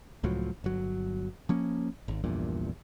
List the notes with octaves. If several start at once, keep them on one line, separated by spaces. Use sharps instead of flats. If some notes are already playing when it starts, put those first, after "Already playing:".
C#2 A2 F3 F#3
G1 F#3
F3 A#3 C#4
G#1
A#1 E2 G2 A#2